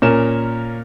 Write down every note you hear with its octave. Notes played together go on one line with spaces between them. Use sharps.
A#2 C#4 A#4 E7